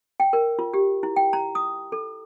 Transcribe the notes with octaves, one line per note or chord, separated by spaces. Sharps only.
G5
A#4
F4
G4
E4
G5
A#5
D#6
A4